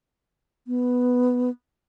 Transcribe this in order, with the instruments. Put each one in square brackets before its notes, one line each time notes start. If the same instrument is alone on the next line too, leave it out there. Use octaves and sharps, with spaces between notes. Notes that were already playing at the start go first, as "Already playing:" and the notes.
[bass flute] B3